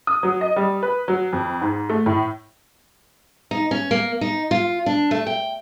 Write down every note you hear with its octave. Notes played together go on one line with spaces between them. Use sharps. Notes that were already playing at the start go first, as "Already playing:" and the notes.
D#6
F#3
D#5
G3
B4
F#3
F2
G#2
A3
A2
D#4
C#4
A#3
D#4
F4
D4
A3
G5